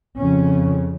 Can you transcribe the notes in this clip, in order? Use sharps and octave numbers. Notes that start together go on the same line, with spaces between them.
F2 C#3 C#4